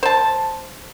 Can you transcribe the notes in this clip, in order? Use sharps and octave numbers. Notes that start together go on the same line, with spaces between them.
C5 A5